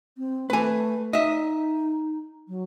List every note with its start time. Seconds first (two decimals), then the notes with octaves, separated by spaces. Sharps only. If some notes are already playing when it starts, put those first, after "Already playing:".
0.17 C4
0.50 A3 B4 G#5
1.13 D#4 D#5 E5
2.48 F#3